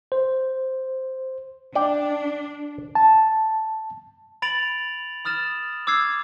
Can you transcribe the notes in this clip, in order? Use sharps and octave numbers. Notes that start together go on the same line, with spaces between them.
C5
D4 D5 G5
A5
B5 A6 D7 F7 F#7
B5 D#6 F6 A6 E7
D6 E6 F6 G#6 C7